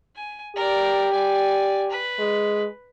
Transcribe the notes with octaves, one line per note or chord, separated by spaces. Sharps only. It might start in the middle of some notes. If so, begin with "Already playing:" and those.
G#5
G4 A#4 D5
D5 G#5
B4
G#3